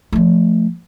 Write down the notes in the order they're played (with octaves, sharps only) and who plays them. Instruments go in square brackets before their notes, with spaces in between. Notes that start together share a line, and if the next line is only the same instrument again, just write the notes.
[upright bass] F3 A3